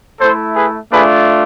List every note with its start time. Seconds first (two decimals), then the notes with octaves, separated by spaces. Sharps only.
0.20 A3 E4 A4 C5
0.56 G#4 B4
0.91 A3 D4 F4 G#4 B4